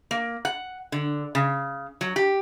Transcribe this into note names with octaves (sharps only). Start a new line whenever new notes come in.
A#3
F#5
D3
C#3
F#3
G4